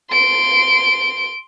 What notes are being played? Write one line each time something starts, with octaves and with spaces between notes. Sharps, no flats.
C6 D7